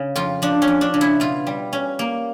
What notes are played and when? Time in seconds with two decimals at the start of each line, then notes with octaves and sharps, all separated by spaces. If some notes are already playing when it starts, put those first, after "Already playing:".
Already playing: C#3
0.16 F2 F4
0.42 F3 D4
0.62 C#4
0.68 F2
0.81 D4
0.94 C#3
1.01 E4
1.20 B2 F4
1.47 G3
1.73 C#4
1.99 A#3